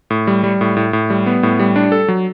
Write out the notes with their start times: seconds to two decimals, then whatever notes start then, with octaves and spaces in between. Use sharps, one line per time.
0.10 A2
0.27 G3
0.43 G3
0.61 A2
0.77 A2
0.93 A2
1.10 G3
1.26 B3
1.43 A2
1.59 G3
1.76 D4
1.92 A4
2.08 F#3